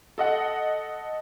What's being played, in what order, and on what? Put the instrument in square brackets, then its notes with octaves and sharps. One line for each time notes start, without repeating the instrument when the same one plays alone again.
[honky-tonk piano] A4 D#5 F#5